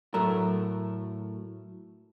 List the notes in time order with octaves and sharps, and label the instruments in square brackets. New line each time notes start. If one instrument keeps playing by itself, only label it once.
[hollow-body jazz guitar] A2 F#3 A3 A#4